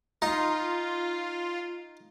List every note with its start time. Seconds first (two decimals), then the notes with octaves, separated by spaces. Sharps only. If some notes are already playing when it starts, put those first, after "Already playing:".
0.22 D#4 F4